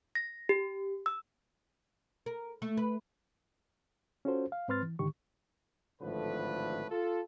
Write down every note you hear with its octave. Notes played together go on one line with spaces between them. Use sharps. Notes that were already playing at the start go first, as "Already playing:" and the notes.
A#6
G4
E6
A#4
A3
B4
C#4 F4 F#4 A4 C5
F5
G#2 C4 B4 C6 F6 A6
E3
G#2 D3 D#3 G4 C#6
G#1 A2 D3 F3 A3 B4
F4 A4